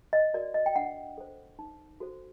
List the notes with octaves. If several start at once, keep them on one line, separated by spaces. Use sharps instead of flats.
D#5
F#4 A#4 D5
D#5
G5
D4 F#5
A4 C5
D#4
F#4 A4 C5